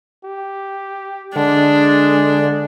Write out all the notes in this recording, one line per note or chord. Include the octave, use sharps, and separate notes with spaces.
G4
D3 G#3 D4